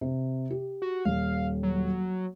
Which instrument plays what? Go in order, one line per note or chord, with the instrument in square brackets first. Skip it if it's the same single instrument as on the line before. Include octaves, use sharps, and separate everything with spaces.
[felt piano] C3
G4
[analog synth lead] F#4
[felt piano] D#1 [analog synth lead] F5
[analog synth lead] F#3